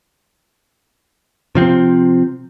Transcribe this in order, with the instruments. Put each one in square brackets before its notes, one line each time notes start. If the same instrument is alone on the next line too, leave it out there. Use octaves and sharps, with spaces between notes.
[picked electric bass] C3 F3 C4